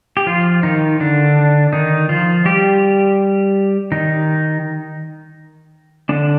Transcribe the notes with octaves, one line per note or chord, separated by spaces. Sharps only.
G4
F3 F4
D#3 D#4
D3 D4
D#3 D#4
F3 F4
G3 G4
D#3 D#4
D3 D4